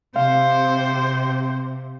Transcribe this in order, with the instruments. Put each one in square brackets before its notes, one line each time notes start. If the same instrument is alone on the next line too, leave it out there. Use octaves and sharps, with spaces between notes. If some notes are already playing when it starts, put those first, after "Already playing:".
[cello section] C3 [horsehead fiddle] C5 [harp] F5